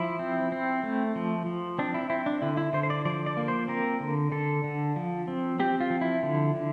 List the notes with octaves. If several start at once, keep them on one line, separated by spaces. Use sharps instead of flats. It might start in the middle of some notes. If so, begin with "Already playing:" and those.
Already playing: F3 E4
C4
C4
A3
F3
F3
C4 D4
E4
C4 E4
D4
D3 E4
E4
D3 C5
C5
D5
F3 D5
D5
A#3
C5
C4 A#4
D3
D3 A4
D3
F3
C4
C4 G4
F4
F3
E4
D3
D3